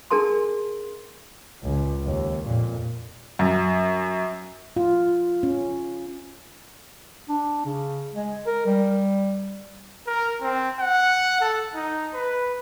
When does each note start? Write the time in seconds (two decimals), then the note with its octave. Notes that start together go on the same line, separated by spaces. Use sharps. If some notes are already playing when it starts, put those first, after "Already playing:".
0.10 D4 G#4 A#4 A5 C6
1.63 C#2
2.04 D#2
2.44 F2 A#2
3.39 F#2
4.76 F4
5.43 C#4
7.29 D4
7.65 C#3
8.14 G#3
8.47 A#4
8.66 G3
10.07 A#4
10.41 C4
10.79 F#5
11.41 A4
11.75 D#4
12.14 B4